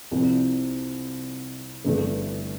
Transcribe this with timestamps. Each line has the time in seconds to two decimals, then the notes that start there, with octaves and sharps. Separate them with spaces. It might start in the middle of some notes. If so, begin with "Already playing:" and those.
0.11 C2 C3 F3
1.85 G1 G2 E3 A3